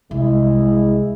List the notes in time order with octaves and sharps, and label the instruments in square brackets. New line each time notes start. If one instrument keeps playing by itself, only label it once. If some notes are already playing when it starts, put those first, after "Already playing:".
[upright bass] C2 [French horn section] G#3 E4